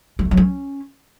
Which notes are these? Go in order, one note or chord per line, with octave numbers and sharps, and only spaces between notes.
G3
A3
F#3
C#4